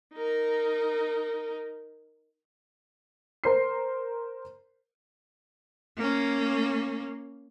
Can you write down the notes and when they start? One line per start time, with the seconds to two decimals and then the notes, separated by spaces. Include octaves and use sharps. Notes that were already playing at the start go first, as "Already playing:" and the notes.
0.14 D#4 A#4
3.44 A#4 C5 C7
5.98 A#3 C#4